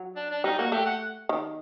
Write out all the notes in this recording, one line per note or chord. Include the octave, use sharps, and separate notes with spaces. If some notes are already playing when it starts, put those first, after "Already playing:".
Already playing: F#3
D4
D4
G3 D#4
A#3 F#4
A3 G4
F#5
D#3